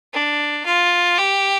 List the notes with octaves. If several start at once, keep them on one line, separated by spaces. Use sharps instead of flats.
D4
F4
G4